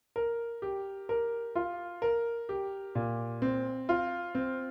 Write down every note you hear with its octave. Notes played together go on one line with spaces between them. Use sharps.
A#4
G4
A#4
F4
A#4
G4
A#2
C4
F4
C4